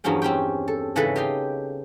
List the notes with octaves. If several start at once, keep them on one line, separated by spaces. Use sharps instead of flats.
E2 G2 F3 F#3 C#4 G5
C4 C#4 G4 G5
A4
G#2 C#3 E3 E4 A4 B4
G4 D#5 F5 G5